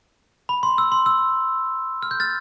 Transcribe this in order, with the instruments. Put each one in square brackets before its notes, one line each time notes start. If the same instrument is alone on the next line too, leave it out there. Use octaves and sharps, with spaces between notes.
[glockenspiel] B5
C6
E6
C6
E6
F6
G6
F6 A6